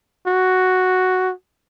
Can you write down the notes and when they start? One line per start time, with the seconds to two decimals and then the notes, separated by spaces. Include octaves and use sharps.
0.27 F#4